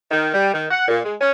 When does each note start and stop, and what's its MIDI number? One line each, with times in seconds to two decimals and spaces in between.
0.11 0.28 51
0.33 0.52 55
0.54 0.66 51
0.71 0.87 78
0.88 1.00 46
1.04 1.15 56
1.20 1.31 61